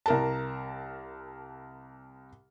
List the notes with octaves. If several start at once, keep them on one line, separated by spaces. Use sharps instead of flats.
C2 A#4 A5